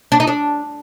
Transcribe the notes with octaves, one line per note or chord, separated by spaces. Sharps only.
D4
D#4
D4